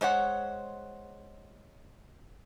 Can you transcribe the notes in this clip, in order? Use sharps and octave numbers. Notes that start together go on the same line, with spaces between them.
G#3 C5 C#5 F#5